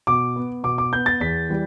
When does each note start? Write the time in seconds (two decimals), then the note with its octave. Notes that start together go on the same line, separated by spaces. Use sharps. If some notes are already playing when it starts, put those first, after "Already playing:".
0.07 B2 D6
0.36 B3
0.63 B2 D6
0.78 D6
0.93 B3 G6
1.06 A6
1.20 E2 B6
1.49 E3 G3